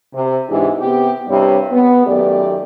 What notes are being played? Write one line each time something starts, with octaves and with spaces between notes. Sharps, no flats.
C3
G#2 E3 D4 G4 G#4
C3 B3 G4
G2 C3 G3 E4 C#5
B3
F#2 D#3 A3 G4 D5